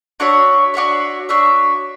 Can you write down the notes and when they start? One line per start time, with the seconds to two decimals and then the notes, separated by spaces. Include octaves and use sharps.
0.20 D4 F#4 C#5 E5
0.74 D4 F#4 C#5 E5
1.29 D4 F#4 C#5 E5